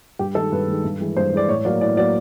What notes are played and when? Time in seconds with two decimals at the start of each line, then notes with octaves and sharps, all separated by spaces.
0.19 G2 G4
0.35 D#3 G#3 A4
0.52 G2 B4
0.68 D#3 G#3
0.84 G2
1.01 E3 G#3
1.17 G2 C5
1.33 E3 G#3 D5
1.48 A2 C#5
1.65 F#3 A#3 D5
1.81 A2 D5
1.97 F#3 D5
2.00 A#3